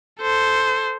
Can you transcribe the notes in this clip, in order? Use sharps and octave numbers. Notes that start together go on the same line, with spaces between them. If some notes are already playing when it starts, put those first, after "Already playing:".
A4 C5